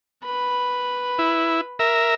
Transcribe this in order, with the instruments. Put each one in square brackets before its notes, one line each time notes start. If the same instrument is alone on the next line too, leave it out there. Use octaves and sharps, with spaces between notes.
[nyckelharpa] B4 B5
[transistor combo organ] E4
A#4 E5